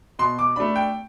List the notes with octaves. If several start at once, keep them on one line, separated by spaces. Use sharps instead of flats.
B2 C6
D6
A3 D4 B5
G5